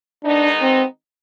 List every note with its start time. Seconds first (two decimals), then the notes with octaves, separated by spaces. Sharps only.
0.25 D#3 G#3 B3 D4 D#4
0.61 C4